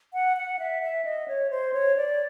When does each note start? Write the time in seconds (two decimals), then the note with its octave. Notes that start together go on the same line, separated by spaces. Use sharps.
0.14 F#5
0.37 F#5
0.59 E5
0.82 E5
1.05 D#5
1.28 C#5
1.50 C5
1.74 C#5
1.96 D5